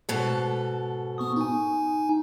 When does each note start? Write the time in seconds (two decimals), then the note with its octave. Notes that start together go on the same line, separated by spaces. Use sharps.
0.09 G#2 B2 A4
1.18 B3 C#6 D#6
1.36 D#4 G#5